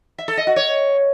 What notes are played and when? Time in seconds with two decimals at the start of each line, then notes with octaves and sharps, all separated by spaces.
0.18 E5
0.28 A4
0.37 D#5
0.47 F#4
0.56 C#5